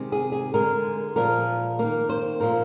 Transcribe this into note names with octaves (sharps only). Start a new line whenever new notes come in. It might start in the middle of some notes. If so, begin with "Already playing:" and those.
Already playing: C3 D#3 G#3
G#4
G#4
D3 G#3 A#4
A#2 F3 G#3 A#4
D#3 A#3 A#4
C5
A#2 F3 A#3 A#4